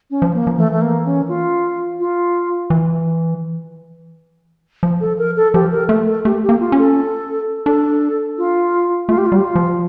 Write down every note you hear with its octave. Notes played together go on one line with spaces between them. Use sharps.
C#4
F3
A#3
F3
E3 A3
A3
A#3
C#4
F4
F4
E3
F3
A4
A#4
A4
F3 G4
A#4
A3 A4
A4
A3 G4
G4
A#3
F4
C#4
A4
D4 A4
F4
A3 F4
G4
F4
G3
G4
F4
F3